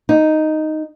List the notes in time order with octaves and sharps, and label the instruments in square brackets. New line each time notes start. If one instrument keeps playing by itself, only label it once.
[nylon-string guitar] D#4